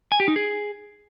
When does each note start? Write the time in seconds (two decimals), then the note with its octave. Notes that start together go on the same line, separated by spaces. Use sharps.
0.12 G#5
0.20 G4
0.28 D#4
0.36 G#4